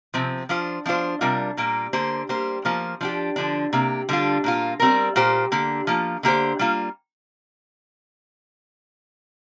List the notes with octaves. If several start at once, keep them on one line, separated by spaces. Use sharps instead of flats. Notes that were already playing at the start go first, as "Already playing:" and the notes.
C3 F3 C4
F3 D4 F4 C5
F3 D4 F4 C5
C3 G3 D4 F4 A#4
A#2 G3 A#3 F4
D3 A#3 G4 C5
G3 A#3 G4 C5
F3 A#3 F4 C5
F3 D4 G4
D3 F3 D4
C3 A#3 G4
D3 G3 D4 F4
A#2 A#3 F4
G3 C4 A#4
A#2 A#3 G4 C5
D3 A#3 G4
F3 A#3 F4
D3 A#3 G4 C5
G3 A#3 F4